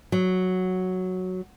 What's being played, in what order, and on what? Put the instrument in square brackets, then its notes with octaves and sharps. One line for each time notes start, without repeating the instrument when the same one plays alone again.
[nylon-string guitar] F#3